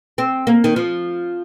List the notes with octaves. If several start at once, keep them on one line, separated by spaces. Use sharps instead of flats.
C4
A#3
D#3
F3